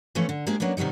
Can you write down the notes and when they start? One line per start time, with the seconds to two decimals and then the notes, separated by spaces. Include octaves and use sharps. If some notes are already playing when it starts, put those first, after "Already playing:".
0.15 E3 F3 A3 C4 C#4
0.29 D3
0.47 G#3 A#3 D4 G4 G#4 C5
0.60 F#3 A#3 B3 C#4 D4
0.77 C3 D#3 F#3 G3 D#4